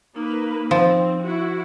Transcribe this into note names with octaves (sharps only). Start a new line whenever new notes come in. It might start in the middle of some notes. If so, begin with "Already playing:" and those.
A#3 D#4 B4
F3 C4
E4 F#4